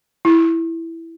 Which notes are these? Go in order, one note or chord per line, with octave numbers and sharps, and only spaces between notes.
E4